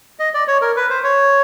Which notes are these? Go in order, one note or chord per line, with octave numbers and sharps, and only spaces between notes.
D#5
D5
C#5
A#4
B4
C5
C#5